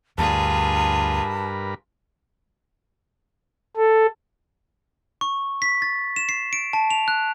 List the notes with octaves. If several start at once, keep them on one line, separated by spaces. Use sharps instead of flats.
D2 G2 F4 G#4 A#4 B4 A5
A4
C#6
B6
A6
E7
C7
D7
A5
F7
F#6